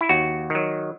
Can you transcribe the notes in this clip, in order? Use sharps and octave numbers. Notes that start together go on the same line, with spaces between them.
E4
D#2 F#4
D#3 F#3